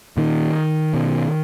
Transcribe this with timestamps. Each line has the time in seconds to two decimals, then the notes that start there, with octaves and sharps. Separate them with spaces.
0.17 A#2 D#3
0.94 B2